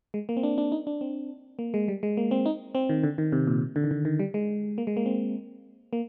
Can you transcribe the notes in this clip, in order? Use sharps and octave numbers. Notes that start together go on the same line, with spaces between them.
G#3
A#3
C4
D4
D4
D#4
D4
C4
A#3
G#3
G3
G#3
A#3
C4
D#4
C4
D#3
D3
D#3
C3
A#2
D3
D#3
D3
D#3
G3
G#3
A#3
G#3
A#3
C4
A#3